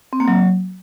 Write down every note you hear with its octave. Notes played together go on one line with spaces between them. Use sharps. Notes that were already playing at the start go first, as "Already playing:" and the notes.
C4
A#3
F#3